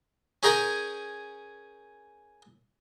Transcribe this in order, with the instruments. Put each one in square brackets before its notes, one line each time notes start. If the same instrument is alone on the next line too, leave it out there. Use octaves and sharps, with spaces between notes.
[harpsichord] C#4 G#4 A#4 G5 A#5